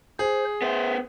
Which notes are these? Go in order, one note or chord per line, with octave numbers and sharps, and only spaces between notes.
G#4 C5
B3 C5 E5